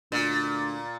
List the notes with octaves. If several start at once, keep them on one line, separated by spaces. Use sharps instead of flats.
D2 A#2